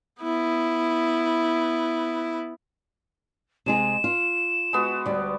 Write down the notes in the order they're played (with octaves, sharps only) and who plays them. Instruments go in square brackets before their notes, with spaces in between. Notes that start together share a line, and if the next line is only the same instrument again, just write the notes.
[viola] B3 E4
[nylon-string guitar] C3 G#3 G#4 [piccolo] E7
[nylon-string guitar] F4
[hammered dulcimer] G#3 B3 F#4
[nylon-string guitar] D2 G3 [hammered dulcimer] D5